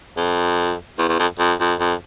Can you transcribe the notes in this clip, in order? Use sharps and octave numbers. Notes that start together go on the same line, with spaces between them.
F2
E2
E2
F2
F2
F2
F2